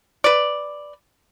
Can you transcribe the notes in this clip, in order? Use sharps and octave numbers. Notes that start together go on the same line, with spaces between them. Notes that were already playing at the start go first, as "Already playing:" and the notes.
B4 D5